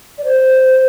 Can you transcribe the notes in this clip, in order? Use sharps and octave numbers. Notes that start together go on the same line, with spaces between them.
D5
C5